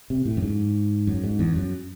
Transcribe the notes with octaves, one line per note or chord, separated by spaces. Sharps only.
C3
A2
F#2
G#2
F#2
G#2
E2
F#2